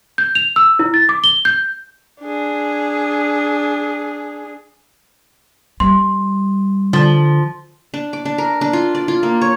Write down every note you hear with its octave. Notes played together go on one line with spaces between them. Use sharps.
G6
F7
E6
E4
A6
D6
G7
G6
D4 G#4
G3 C6
D3 F3
D4
D6
D4
A#4
D4
F4
D5
F4
A#3
C#5